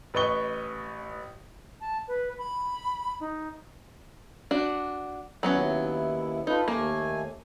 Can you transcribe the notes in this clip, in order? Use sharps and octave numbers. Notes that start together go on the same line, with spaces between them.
A1 B4 D#5 C#6 G7
A5
B4
B5
D#4
D4 F#4
D#2 F#3 B3 C#4 E4
D#4 F4 A4 B4
D#2 A3 A#3 G#5